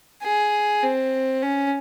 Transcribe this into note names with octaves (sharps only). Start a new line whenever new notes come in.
G#4
C4
C#4